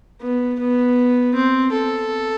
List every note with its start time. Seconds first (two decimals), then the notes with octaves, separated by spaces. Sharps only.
0.21 B3
0.60 B3
1.35 C4
1.72 A4